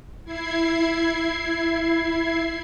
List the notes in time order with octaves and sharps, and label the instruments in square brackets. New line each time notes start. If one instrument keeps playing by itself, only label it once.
[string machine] E4 G#6 C7